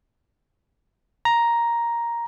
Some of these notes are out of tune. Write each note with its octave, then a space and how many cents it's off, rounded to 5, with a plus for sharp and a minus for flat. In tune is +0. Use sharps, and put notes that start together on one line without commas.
A#5 +5